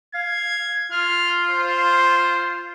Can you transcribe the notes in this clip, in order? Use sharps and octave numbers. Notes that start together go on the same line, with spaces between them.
F5 G#6
F4 F6
C5